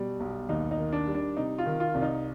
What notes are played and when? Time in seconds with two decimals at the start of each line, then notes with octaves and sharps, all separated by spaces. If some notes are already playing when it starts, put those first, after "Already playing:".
Already playing: B2 G3
0.20 B1
0.49 D#2 D#4
0.71 D#4
0.78 D#3
0.92 D4
1.07 G3
1.15 D4
1.37 C3 D#4
1.58 F4
1.66 D#3
1.80 F4
1.94 C2
2.02 D#4